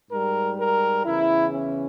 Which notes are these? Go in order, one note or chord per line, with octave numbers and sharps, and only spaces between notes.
G#2 G3 A#4
A#4
E2 C#3 E3 E4
C#4